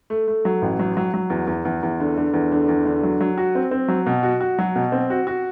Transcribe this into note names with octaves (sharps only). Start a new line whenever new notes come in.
A3
A3
F#3
A1
F#3
F#3
F#3
E2
E2
E2
E2
D3
D3
E2
D3
E2
D3
F#3
F#3
F#4
C4
C4
F#3
B2
F#4
F#4
F#3
B2
C4
F#4
F#4